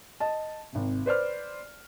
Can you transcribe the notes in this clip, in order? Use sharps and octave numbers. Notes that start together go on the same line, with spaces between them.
D#5 A5
G#1 C3
B4 C5 D5 F6